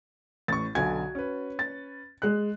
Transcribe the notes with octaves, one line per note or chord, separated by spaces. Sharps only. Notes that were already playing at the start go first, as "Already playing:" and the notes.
A1 A2 C#6 A6
B1 D3 F#4 G#5 G#6
C#4 B4
A6
G#3 F#6